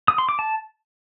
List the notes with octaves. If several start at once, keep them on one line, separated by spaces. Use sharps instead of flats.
D#6
C6
D6
A5